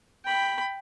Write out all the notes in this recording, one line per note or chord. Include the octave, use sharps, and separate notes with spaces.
G5 B5